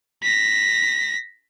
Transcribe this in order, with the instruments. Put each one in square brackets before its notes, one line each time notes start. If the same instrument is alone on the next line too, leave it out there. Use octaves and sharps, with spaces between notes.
[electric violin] A#6 B6